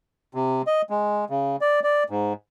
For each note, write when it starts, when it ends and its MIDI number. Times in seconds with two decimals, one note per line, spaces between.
0.35 0.62 48
0.67 0.82 75
0.90 1.25 56
1.30 1.56 49
1.61 1.80 74
1.83 2.04 74
2.10 2.33 44